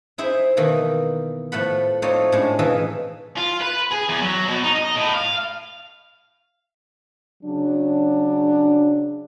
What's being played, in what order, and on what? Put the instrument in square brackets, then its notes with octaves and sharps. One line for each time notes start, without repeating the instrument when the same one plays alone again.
[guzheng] D#4 E4 G#4 C5 E5
B2 D#3 E3 A#3
A2 F3 A3 B4 F#5 B5
A3 C4 D#4 F4 C#5 D5
A2 G#3 C#4 D4
B2 E3 D#4 E5 F5
[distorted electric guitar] F4
B4
G#4
E2
F#3
B2
D#4
D#5
A2
F5
[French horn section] C#3 F#3 D4